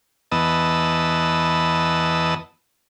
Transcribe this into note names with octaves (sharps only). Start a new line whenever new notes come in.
E2 B3 D#5 A5 E6